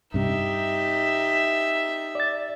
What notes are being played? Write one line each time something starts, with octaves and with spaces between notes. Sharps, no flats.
G2 C3 D#4 G4 E5
D5 A6